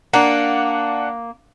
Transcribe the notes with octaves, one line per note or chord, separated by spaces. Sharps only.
A#3 D4 F#5